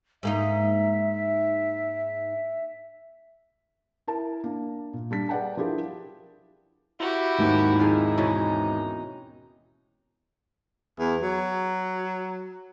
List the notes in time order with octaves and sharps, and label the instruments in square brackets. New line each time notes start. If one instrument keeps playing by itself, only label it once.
[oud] G#2 A#3 D#4 [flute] E5
[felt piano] E4 A#4 A5
A#3 D4
A#2
G3 D4 B6
G#4 B4 D5 F#5 G5 A5
F3 D4 E4 G4 G#4 A#4
[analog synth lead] E4 [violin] F#4 G4
[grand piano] D#2 G#2 C4
[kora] D#3 F3 G#4 [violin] D#4
[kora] B2 E3 C#4
[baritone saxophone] E2
F#3